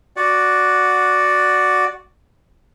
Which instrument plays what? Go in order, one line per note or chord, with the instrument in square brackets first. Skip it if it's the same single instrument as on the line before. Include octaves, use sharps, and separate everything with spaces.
[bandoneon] F#4 D5 F#5